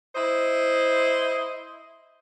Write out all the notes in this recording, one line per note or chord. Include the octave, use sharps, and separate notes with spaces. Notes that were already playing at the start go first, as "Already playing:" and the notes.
E4 C5 D#5